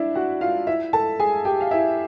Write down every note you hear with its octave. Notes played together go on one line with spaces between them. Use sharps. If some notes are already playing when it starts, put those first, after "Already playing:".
Already playing: D4 E4 D5 E5
F#4 F#5
F4 F5
E4 E5
A4 A5
G#4 G#5
G4 G5
F5
E4 E5